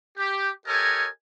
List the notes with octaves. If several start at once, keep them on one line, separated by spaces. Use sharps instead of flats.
G4
G4 A4 A#4 C#5 D#5 G#5